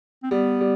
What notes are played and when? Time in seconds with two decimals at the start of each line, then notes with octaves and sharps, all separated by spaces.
0.23 C4
0.31 G3 B3
0.61 G3